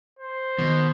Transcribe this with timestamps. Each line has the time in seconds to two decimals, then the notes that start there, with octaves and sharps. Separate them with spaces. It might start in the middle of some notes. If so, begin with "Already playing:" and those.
0.19 C5
0.59 B2 D#3